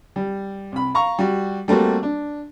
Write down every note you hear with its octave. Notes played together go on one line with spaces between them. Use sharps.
G3
C2 B5
F5 A#5 C#6
G3 F#4
G3 A3 A#3 C4 F#4
D4